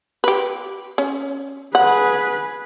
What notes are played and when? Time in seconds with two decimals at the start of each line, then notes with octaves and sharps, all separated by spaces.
0.24 G4 B4
0.98 C#4
1.75 G#4 B4 F#5